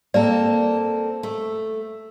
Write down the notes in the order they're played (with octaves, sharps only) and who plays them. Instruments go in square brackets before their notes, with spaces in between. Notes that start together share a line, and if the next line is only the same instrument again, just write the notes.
[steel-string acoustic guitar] A#3 C4 A4 [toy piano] D5
[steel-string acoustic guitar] A3